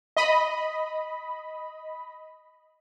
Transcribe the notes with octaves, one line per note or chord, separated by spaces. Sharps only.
D#5 B5